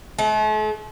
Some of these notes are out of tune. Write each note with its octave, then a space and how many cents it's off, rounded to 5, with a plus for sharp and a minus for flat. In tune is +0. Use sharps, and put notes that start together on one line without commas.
A3 -45